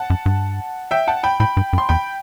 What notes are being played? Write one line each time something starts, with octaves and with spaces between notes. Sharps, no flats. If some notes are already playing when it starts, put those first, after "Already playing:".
Already playing: F#5 A5
F#2
G2
E5 G5
F#5 A5
G5 B5
A2 G5 B5
G2
F#2
C6
E2 G5 B5